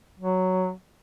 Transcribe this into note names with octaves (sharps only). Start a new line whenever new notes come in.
F#3